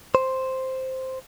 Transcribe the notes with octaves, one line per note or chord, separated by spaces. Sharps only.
C5